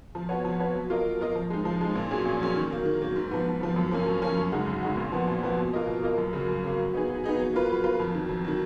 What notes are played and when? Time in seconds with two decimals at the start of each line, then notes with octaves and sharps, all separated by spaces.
0.15 F3
0.29 B3 F#4 C#5
0.45 F3
0.60 B3 F#4 C#5
0.75 F#3
0.90 A#3 F4 A#4 D#5
1.04 F#3
1.20 A#3 F4 A#4 D#5
1.35 F3
1.50 G#3 D#4
1.65 F3
1.81 G#3 D#4
1.95 A#2
2.11 F#3 C#4 G#4
2.25 A#2
2.40 F#3 C#4 G#4
2.56 D#3
2.71 F#3 A#3
2.85 D#3
3.02 F#3 A#3
3.16 G#2
3.31 F3 B3
3.46 G#2
3.61 F3 B3
3.76 F#2
3.91 F3 A#3 C#4
4.06 F#2
4.22 F3 A#3 C#4
4.37 F#2
4.52 C#3 G#3 D#4 F#4
4.67 F#2
4.83 C#3 G#3 D#4 F#4
4.97 A#2
5.12 F3 B3 F#4
5.27 A#2
5.43 F3 B3 F#4
5.57 B2
5.73 A#3 F4 A#4 D#5
5.87 B2
6.02 A#3 F4 A#4 D#5
6.18 F#2
6.33 C#3 F#3 A#3
6.48 F#2
6.64 C#3 F#3 A#3
6.78 F#3
6.94 B3 D#4 G#4
7.09 F#3
7.24 B3 D#4 G#4
7.39 F#3
7.53 A#3 F4 B4
7.70 F#3
7.84 A#3 F4 B4
8.00 F2
8.15 D#3 F#3
8.29 F2
8.45 D#3 F#3